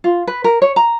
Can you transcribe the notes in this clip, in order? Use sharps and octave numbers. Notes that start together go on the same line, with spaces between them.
F4
B4
A#4
C#5
A#5